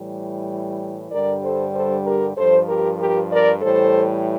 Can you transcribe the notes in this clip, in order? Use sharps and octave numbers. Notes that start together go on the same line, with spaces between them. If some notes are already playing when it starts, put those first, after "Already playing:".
Already playing: A2 E3 G3
G2 D3 G3 A#4 D5
A4 C5
A4 C5
G4 A#4
G2 F3 A4 C5
G4 A#4
G4 A#4
A#4 D5
A2 E3 G3 A4 C5